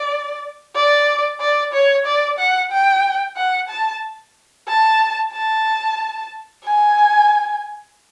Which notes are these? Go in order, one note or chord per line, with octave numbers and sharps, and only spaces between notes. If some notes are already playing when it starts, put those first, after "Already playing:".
Already playing: D5
D5
D5
C#5
D5
F#5
G5
F#5
A5
A5
A5
G#5